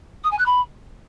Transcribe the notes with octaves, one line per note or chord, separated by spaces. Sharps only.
D#6
G#5
F#6
B5